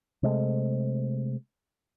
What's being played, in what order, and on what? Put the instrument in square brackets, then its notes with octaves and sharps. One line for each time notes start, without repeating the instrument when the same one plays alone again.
[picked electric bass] C3 G#3 A3